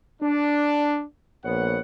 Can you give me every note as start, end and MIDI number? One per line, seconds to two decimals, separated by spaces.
0.22 1.03 62
1.44 1.78 34
1.44 1.78 59
1.44 1.78 73
1.44 1.78 78